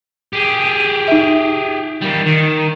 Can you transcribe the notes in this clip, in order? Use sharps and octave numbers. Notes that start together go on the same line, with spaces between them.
G4 G#4
D#4 E5
G3 A#3
D#3